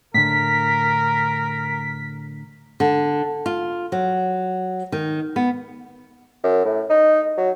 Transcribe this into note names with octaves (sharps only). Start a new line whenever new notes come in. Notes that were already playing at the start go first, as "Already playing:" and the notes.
A2 D3 A#4 B6
D3
F4
F#3
D#3
B3
F#2
A2
D#4
F#3